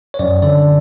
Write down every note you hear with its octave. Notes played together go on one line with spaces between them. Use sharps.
C#5
F#2 D5
D3 D5